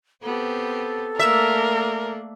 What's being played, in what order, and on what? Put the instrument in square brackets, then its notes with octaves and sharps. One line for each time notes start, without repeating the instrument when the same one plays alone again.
[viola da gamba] B3 C4 G4 [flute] A4
[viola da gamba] A3 A#3 D4 [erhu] A#4 [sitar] E5